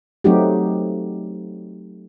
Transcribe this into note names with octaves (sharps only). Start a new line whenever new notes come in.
F#3 A3 C4 D#4 F#4 G4